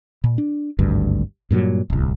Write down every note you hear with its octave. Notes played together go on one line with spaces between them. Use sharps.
A#2
D4
G#1 D2 G2
G2 A#2 D3 F#3
D1 C2